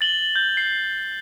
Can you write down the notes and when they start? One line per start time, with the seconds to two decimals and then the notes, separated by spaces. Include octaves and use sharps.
0.01 A6 F#7 G7
0.36 G6
0.57 C7